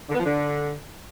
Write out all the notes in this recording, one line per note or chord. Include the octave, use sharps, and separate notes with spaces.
D3
B3
F3
D3